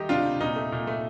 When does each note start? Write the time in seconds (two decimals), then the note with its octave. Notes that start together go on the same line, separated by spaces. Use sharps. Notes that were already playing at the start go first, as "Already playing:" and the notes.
Already playing: D#3 G3 A3 D#4 G4
0.09 C3 D4 F4
0.25 C3
0.40 A#2 D#4
0.56 A3
0.72 A#2
0.87 A3